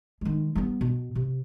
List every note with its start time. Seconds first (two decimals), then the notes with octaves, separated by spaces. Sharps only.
0.21 D#3 G#3
0.55 G3 B3
0.81 B2
1.15 C3